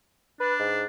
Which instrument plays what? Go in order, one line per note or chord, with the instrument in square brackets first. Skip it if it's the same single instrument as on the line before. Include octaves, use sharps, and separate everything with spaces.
[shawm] D4 [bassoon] B4
[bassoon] G#2